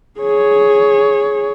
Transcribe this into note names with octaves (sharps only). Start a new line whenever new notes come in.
G#4 C#5